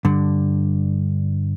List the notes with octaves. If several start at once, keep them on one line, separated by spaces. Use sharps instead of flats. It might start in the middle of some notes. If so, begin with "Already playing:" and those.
G2 D3